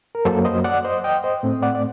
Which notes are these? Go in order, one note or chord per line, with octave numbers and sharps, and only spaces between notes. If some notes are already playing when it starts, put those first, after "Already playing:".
A#4
F#2 F#3 A#3 A4 C5
C5 D#5
D5 F#5
C5 D#5
D#5 G5
C5 D#5
A2 A3 C4
D5 F#5
D5